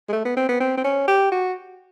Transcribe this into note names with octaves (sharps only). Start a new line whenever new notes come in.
G#3
A3
B3
C4
B3
C4
C4
C#4
G4
F#4